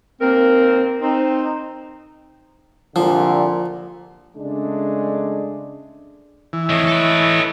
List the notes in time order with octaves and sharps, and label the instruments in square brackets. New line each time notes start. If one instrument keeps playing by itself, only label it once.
[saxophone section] D#2 A#3 A#4 [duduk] C4
[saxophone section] C4 [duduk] D#4
[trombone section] C2 A#2 D3 [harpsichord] F3
[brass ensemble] C#3 G#3 A3 D4
[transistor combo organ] E3
[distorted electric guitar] F2 D#3 [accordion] A3 C#5 D#5
[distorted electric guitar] A4 B4